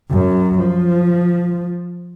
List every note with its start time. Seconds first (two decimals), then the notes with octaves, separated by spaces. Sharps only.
0.10 F#2 F#3
0.59 F3